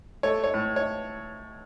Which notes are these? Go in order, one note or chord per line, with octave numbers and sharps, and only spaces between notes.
A3 C#5
C#5
A2
C#5